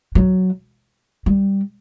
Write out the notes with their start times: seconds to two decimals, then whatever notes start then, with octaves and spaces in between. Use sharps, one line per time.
0.15 F#3
1.26 G3